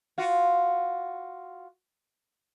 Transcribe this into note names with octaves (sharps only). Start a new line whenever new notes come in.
F4 F#4